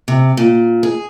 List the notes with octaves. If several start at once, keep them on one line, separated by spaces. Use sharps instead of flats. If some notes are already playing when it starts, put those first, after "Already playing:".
C3
A#2
G#4